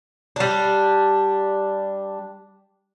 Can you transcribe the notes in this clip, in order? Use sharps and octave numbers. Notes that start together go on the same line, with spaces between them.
G3 D4